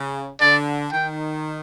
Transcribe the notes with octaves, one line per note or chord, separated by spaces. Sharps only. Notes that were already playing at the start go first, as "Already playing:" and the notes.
Already playing: C#3
D3 D5
D#3 G5